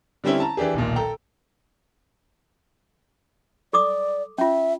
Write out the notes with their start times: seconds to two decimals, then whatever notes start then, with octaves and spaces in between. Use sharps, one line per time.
0.24 D3 G3 C4 C#4 E4
0.40 A5 A#5
0.57 E3 D4 G4 G#4
0.74 D#1 B1 A#2
0.96 A4 G5 A#5
3.73 A4 D5 D6 D#6
4.38 C#4 F4 E5